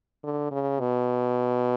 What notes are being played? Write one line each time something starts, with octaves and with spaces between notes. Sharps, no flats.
D3
C#3
B2